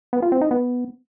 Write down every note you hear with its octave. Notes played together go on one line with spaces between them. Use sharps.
B3
F4
C4
D#4
B3